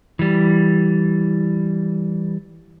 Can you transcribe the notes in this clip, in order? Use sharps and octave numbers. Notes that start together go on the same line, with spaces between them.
E3 G3